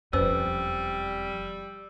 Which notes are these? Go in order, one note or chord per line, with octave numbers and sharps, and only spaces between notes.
E1 F2 G3 C#4 B4 C5 E6